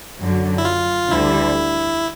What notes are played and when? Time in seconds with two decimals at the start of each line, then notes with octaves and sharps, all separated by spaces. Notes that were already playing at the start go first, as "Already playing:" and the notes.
0.20 F#2 D3 F#3
0.58 E4
0.65 F4
1.11 D2 D3 G3 E4